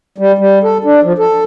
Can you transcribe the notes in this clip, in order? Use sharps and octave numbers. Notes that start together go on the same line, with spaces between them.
G3
G3
A4
D4
F3
A4